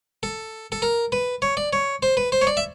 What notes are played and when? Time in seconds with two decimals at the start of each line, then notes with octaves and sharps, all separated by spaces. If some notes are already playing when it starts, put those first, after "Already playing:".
0.23 A4
0.72 A4
0.82 A#4
1.12 B4
1.42 C#5
1.57 D5
1.73 C#5
2.03 C5
2.17 B4
2.32 C5
2.42 C#5
2.47 D5
2.57 E5